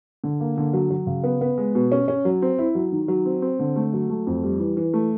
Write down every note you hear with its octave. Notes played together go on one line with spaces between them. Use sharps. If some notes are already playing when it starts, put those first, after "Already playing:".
D3
A#3
D3
F#3
F#3
C#3
B3
B3
G#3
B2
C#4
C#4
F#3
C4
E4
F#3
D#3
F#3
C4
C4
D3
A3
F#3
A3
F2
G3
E3
E3
A3